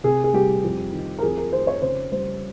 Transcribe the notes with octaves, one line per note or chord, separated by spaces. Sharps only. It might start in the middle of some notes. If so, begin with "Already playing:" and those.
C3 G#4
G#4
G3 G4
F2
D#3
A#4
F2 G#4
A#4
D#3 C5
C#5
C#3 C5
G3 C5